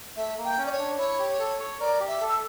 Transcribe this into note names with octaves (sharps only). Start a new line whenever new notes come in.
A3 E5
A#3
G5
C#4
D5
C#5
D4
E4 C#5
G4
A4
C#5
A#4 D5
G4
E5
A4
E6